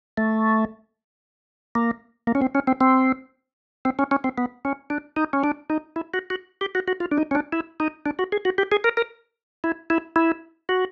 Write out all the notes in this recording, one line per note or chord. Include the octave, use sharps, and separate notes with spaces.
A3
A#3
A#3
C#4
C4
C#4
C4
C4
C4
C#4
C#4
C4
B3
C#4
D4
D#4
C#4
D4
D#4
E4
F#4
F#4
G4
F#4
F#4
F4
D4
D#4
C#4
D4
E4
D#4
D4
F#4
G#4
F#4
G4
G#4
A#4
A#4
E4
E4
E4
F#4